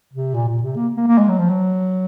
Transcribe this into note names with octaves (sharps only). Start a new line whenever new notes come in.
C3
A#2
A#2
C3
A#3
A#3
A#3
G#3
F#3
F3
F#3